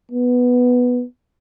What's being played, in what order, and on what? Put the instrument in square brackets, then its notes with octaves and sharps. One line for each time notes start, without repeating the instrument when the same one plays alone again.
[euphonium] B3